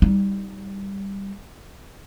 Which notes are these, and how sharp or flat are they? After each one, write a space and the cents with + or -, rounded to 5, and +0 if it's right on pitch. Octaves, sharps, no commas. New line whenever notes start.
G3 +5 D#4 +20